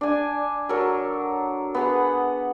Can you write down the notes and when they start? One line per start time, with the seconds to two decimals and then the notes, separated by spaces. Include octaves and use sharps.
0.01 D4 G#5
0.69 F#3 A4 A#4
1.75 B3 G#4 F#5